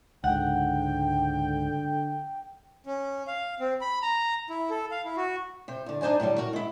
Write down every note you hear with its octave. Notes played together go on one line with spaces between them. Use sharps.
C#2 G#2 D3 F#5 G5
C#4
F5
C4
B5
A#5
E4
A4
F5
E4
F#4
C3 C5
E2 D3
D4 D#4 C5 D5 G#5
A2 D3 F#3 G3
F#4 A#4
G#3 E4